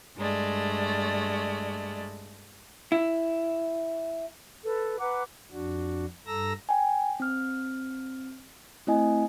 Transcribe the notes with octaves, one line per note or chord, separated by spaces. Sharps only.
G2 G#3 A3 D5
E4
A4 B4
B4 F#5 A#5 D6
F2 D4 F#4
G2 A4 A#5 E6 A#6
G5 G#5
C4 F6
A3 C4 E4 D#5 G#5